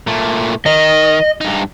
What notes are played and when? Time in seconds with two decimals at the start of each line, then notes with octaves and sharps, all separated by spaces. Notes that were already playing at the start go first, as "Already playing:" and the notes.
0.07 A#2 A3
0.66 D#3 D#5
1.41 G2 D#4